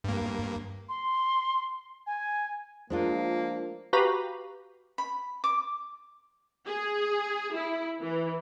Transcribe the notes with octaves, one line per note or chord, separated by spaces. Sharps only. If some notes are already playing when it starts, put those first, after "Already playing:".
G2 A#3
C6
G#5
F3 G#3 A#3 D4 F4
F#4 G4 B4 F5 A#5 B5
B5
D6
G#4
E4
E3